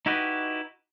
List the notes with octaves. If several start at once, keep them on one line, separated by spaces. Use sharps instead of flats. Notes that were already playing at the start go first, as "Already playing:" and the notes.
D#4 E4 F#4 G4 B4 D#5